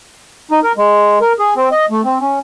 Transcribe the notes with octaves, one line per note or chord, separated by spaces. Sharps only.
D#4
A#4
G#3
A#4
G#4
C4
D#5
A3
C4
C#4